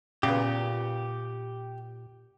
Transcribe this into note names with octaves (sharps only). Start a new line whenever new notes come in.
A#2 C#3 B3 G4